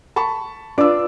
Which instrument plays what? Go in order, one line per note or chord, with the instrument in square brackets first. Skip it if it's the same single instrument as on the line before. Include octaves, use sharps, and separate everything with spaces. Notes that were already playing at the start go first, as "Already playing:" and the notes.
[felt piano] A5 B5 C#6
[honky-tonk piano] D4 [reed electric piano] F4 B4 D5 [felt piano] D6 E6